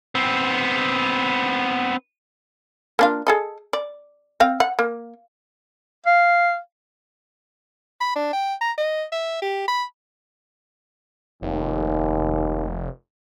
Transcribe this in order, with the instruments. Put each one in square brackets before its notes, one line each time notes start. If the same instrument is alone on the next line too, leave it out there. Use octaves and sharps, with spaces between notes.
[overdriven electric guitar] B3 C4
[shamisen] A#3 D4 F4
G#4 A4 D#5
D5
C4 F5
F#5
A#3
[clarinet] F5
[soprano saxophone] B5
D4
G5
A#5
D#5
E5
G4
B5
[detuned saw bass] F1 [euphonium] D#2